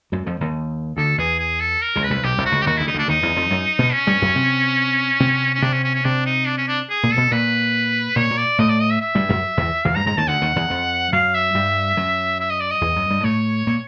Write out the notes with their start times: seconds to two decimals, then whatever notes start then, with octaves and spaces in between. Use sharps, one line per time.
0.12 F#2 F#3
0.26 F2 F3
0.41 D#2 D#3
0.97 D2 D3 A4
1.18 E2 E3 G#4
1.39 G#4
1.60 A4
1.82 A#4
1.96 C#2 C#3
2.03 B4
2.10 C2 C3
2.24 B1 B2 G4
2.38 C2 C3
2.46 F#4
2.52 C#2 C#3
2.62 G4
2.66 D#2 D#3 F#4
2.77 D2 D3 E4
2.87 C#3 D#4
2.94 D2 D3 D4
3.08 D#2 D#3 D#4
3.23 E2 E3
3.36 F2 F3
3.51 F#2 F#3
3.79 B2 B3
3.94 C#4
4.07 G2 G3
4.22 F#2 F#3
4.35 C3 C4
5.20 C3 C4
5.55 C#4
5.62 C3 C4 D4
5.73 C#4
5.84 C#4
5.94 C#4
6.05 C3 C4 D4
6.26 D#4
6.47 D4
6.58 C#4
6.68 D4
6.90 G#4
7.03 A#2 A#3
7.11 A4
7.17 B2 B3
7.31 A#2 A#3 B4
8.16 A#2 A#3 C#5
8.30 A#2 A#3
8.38 D5
8.58 A2 A3 D#5
8.69 D5
8.80 D#5
8.90 E5
9.01 E5
9.15 G2 G3
9.29 F#2 F#3
9.57 E2 E3
9.85 E2 E3 F5
9.96 G2 G3 A#5
10.06 G#2 G#3 A#5
10.17 D#2 D#3 A5
10.27 D2 D3 F#5
10.41 D#2 D#3
10.56 E2 E3
10.70 F2 F3
11.13 F#2 F#3 F5
11.34 E5
11.55 G2 G3
11.97 F#2 F#3
12.40 E5
12.50 D#5
12.60 D5
12.71 D#5
12.81 E2 E3
12.96 F#2 F#3
13.10 G2 G3
13.23 A2 A3 C#5
13.67 A#2 A#3